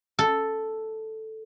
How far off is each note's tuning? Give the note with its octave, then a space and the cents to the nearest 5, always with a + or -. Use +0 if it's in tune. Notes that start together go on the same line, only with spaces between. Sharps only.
A4 +0